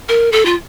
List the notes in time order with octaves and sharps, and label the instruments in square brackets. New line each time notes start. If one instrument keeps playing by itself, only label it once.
[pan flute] A#4
A4
F4